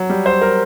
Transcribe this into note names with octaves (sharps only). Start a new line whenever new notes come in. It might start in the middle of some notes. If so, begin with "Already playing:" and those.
Already playing: F#3
G3
C5
A#4